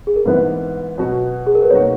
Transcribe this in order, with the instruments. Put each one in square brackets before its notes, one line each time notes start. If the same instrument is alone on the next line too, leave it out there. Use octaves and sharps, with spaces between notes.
[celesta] G#4
A#4
[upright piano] G#2 E3 B3 E4 [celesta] B4
[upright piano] B2 F#3 B3 F#4
[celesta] G#4
A#4
B4
[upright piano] B2 F#3 A#3 D#4 F#4 [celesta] C#5